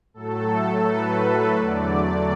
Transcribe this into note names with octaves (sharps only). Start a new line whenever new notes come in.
A2 F#3 A3 A4
B4
E2 D3 F#3 A3 D5